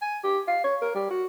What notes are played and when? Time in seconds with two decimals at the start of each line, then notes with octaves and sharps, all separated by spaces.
0.02 G#5
0.24 G4
0.48 F5
0.64 C#5
0.82 A#4
0.95 G3
1.10 F#4